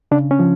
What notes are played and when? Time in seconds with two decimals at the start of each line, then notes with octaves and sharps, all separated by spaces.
0.11 C#3 D4
0.31 C#4
0.39 F3